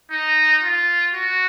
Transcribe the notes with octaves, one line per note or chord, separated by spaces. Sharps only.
D#4
F4
F#4